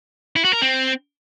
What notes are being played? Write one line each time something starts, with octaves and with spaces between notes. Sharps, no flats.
E4
F#4
A#4
C4